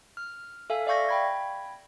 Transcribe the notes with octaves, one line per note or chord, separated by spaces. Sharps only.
F6
A4 E5 F5 G#5
D5 E5 F5 C#6 G6 A#6
G5 B5 G#6